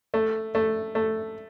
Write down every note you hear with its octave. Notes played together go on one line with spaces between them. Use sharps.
A3
A3
A3